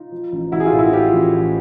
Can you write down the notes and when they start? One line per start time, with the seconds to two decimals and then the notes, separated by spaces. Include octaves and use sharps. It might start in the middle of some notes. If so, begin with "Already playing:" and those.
Already playing: D#4 F4
0.12 F3
0.32 A1
0.52 A1 E4 F#4
0.60 G#4
0.66 F4 G4
0.73 A2
0.79 E4 F#4
0.93 F3 F4 G4
1.13 A1
1.34 A1